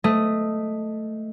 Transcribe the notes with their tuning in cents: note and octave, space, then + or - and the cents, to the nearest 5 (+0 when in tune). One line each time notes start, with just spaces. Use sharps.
A3 +0 D#5 +0